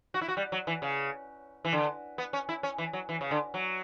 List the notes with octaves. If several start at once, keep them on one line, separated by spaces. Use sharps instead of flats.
F#4
E4
F#4
G3
F#3
E3
C#3
E3
D3
B3
C#4
E4
C#4
E3
F#3
E3
C#3
D3
F#3